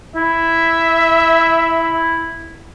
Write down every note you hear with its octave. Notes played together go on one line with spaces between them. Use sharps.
E4 E5